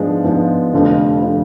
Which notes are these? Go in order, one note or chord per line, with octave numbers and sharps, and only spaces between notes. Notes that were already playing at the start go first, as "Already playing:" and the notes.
Already playing: G#2 F3 G#3 B3 D4
G#2 F3 G#3 B3 D4
F1 F2 D3 F3
D3 F3